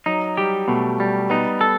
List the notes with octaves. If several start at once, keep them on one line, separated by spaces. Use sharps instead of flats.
F#3 D#4
G3 G4
B2 A3
G3
B3 D#4
A4